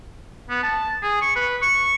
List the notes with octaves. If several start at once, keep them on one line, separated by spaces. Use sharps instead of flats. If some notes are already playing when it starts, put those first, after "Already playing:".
B3
A5
G#4
C#6
B4
C#6